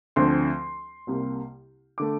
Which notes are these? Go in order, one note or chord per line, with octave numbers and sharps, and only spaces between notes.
D2 D3 F3 C4 C6
C2 C3 G3 A#3
D3 A3 D6